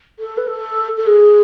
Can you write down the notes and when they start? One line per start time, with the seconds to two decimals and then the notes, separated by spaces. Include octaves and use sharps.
0.19 A4
0.37 B4
0.47 A4
0.97 A4
1.07 G#4